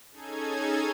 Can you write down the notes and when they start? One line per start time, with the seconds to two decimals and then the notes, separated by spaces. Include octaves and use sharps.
0.11 C#4 D#4 G#4 A4 G#6